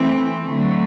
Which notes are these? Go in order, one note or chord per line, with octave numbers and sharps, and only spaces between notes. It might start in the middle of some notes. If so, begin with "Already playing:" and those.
Already playing: E3 A3 C4
D3 F#3 A3